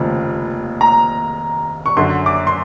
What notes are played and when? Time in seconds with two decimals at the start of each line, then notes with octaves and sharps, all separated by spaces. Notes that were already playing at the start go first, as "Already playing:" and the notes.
Already playing: F1 D#2 C#3 F3
0.81 A#5
1.86 C#6
1.97 F#2 D3 F#3 C6
2.26 D6
2.47 C6